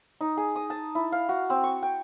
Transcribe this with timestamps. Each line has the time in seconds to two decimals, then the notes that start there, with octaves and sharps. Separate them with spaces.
0.21 D#4
0.37 G#4
0.56 D#6
0.70 A5
0.95 E4
1.12 F5
1.29 F#4
1.50 C4
1.64 C#6
1.83 G5